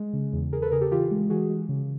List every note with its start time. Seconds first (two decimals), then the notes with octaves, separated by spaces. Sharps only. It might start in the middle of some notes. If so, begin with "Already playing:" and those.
Already playing: G#3
0.13 C#3
0.33 E2
0.52 E2 G#4 A#4
0.62 A4 B4
0.71 C#3 G#4 A#4
0.81 G4 A4
0.91 E3 F4 G4
1.11 G#3
1.30 E3 F#4 G#4
1.49 G#3
1.69 C#3